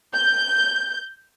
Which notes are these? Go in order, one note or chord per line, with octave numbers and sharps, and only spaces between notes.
G6